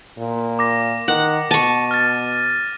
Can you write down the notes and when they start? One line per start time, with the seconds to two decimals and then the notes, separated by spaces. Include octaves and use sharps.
0.18 A#2
0.59 D6 A#6
1.08 D#3 F#5
1.51 B2 A5 C#6 D#7
1.91 F6 A6